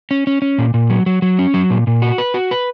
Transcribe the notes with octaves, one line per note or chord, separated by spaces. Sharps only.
C#4
C#4
C#4
A#2
A#2
F#3
F#3
F#3
C#4
F#3
A#2
A#2
F#4
B4
F#4
B4